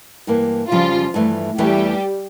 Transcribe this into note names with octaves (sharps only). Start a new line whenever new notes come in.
G2 E3 A#3
F2 C#3 F3 G3 F4
G2 E3 A3
E2 E3 G3 A3 G4